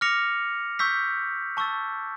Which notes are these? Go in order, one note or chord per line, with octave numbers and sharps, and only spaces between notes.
D6 F6 A#6 C#7 F7
C#6 E6 G6 B6
A5 C#6 E6 A6